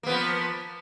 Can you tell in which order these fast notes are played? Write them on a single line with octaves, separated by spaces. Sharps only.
A#3 B3 F3